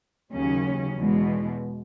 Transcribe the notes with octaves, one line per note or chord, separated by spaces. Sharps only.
D#2 C#3 F#3 C#4
E2 B2 G#3